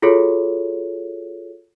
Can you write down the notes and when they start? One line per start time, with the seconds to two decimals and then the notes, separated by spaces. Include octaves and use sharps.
0.02 F4 F#4 G#4 A4 C#5